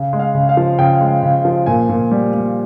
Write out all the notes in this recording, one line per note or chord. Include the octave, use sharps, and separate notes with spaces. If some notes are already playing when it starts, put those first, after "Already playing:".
Already playing: C#3
G#3
F5
C#3
F5
F3
C#3 G5
G#3
C#3
F3
A#2 G#5
A#2
G3
G3